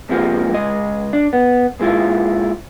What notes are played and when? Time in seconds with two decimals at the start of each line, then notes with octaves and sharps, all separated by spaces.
0.09 G#2 C3 F3 G#3 A#3
0.54 C#2 G#3 D#5
1.13 D4
1.33 B3
1.80 A#2 G#3 E4 F4